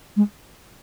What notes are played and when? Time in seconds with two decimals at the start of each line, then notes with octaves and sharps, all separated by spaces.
0.16 G#3